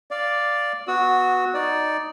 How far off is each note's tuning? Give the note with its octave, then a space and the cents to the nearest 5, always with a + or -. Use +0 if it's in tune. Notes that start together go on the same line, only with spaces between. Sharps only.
D5 +0 F5 +0
B3 +5 F#4 -5 E6 -35
D#4 +0 D5 +0